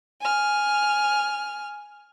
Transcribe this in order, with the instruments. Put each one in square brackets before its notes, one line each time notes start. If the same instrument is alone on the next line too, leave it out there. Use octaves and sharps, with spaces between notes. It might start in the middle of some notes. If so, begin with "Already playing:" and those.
[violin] G#5 F6